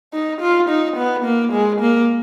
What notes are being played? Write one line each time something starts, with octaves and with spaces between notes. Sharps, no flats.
D#4
F4
D#4
B3
A#3
G#3
A#3